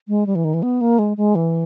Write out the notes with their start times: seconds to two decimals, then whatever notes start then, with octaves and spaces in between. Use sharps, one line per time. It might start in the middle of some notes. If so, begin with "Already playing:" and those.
0.08 G#3
0.26 G3
0.35 E3
0.44 D#3
0.54 E3
0.63 B3
0.81 A#3
0.99 G#3
1.17 G#3
1.35 E3